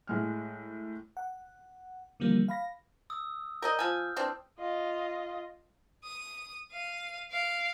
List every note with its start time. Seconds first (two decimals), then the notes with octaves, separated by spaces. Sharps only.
0.07 A2 G#3 F6
1.17 F#5
2.20 D3 E3 F3 G3 A#3
2.48 F5 B5 A#6
3.10 D#6 E6
3.62 A#4 D5 D#5 G6
3.79 F3 G#5 F6
4.16 E3 C4 D4
4.59 F4 D#5
6.04 D#6
6.71 F5 D#7
7.31 F5 D7